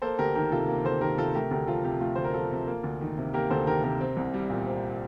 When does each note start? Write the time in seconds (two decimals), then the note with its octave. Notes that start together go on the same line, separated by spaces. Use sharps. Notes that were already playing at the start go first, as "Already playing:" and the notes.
0.02 A#3 A4 C5
0.19 D2 G4 A#4
0.35 D#3 G4 A#4
0.52 C3 F4 A4
0.68 A#3
0.85 D2 A4 C5
1.01 D#3 G4 A#4
1.18 C3 F4 A4
1.35 A3 G4 A#4
1.51 D2 G4 A#4
1.67 F3 F4 A4
1.84 C3 G4
2.01 A3 F4
2.15 D2 C5
2.24 A#4
2.34 F3 F4 A4
2.51 C3
2.68 A#3
2.84 D2
3.01 D#3
3.18 C3
3.34 A#3 G4 A#4
3.50 D2 A4 C5
3.66 D#3 G4 A#4
3.83 C3 G4 A#4
4.01 C4
4.17 C2
4.34 G3
4.50 A#2
4.67 C4